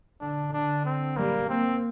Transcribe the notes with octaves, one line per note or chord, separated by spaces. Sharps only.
D3 D4
D3 D4
C4
G3 A#3
A#3 C4